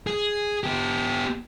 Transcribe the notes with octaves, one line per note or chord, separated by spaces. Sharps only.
G#4
B3 G4